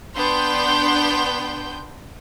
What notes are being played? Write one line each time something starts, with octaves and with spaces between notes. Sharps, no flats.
B3 D4 G5 C6 G6